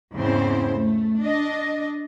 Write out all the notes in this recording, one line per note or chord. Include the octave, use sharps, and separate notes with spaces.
E2 G#2 C#3 C4 E4 C5
A3
D4 D#5